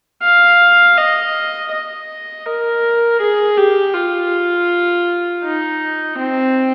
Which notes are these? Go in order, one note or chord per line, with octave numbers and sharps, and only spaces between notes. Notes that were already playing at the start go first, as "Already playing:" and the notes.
F5
D#5
D#5
A#4
G#4
G4
F4
D#4
C4